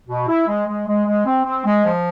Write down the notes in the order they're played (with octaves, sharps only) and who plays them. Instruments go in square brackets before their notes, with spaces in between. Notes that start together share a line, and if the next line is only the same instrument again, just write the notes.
[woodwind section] B2
E4
G#3
G#3
G#3
G#3
C4
C4
G#3
F3